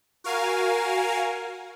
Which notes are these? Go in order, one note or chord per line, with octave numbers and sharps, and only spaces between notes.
F#4 A#4 F5 G#5